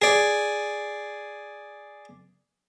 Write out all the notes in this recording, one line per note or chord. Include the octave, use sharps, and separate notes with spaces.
G#4 D5